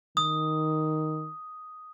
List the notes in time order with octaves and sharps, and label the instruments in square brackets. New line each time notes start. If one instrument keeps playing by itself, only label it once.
[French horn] D#3 [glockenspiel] D#6